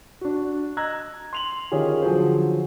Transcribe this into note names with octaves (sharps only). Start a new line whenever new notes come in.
D4 F#4
D#5 A#5 E6 F#6 G#6 A#6
C6 F7 F#7
D#3 C#4 F4 G4 G#4
D3 F3 F#3 G#4 A4 C5